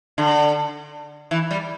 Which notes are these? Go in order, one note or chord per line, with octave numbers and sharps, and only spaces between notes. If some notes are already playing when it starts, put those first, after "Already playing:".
D3
E3
G3